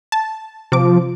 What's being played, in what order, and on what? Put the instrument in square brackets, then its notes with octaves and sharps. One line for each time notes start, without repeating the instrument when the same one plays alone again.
[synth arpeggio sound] A5
[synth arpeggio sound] C3 D6 [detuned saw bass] F3